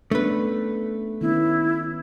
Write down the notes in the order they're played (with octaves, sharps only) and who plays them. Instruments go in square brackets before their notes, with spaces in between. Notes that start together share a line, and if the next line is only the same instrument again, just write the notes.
[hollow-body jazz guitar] A3 B4 [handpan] B3 C#4 D4
[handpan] D#3 B3 C#4 [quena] E4